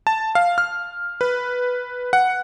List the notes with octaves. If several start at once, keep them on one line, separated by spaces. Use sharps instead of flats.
A5
F5
F6
B4
F#5